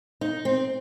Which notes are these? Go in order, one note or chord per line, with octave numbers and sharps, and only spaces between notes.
D#4
C4